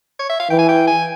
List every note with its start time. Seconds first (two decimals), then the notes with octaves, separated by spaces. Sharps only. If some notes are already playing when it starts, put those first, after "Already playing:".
0.19 C#5
0.29 E5
0.40 F5
0.50 E3 G5
0.59 G#5
0.69 G5
0.87 G#5